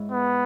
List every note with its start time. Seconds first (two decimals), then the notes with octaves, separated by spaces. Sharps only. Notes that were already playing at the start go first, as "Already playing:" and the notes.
Already playing: G#2 G#3 E4 C#5
0.11 B3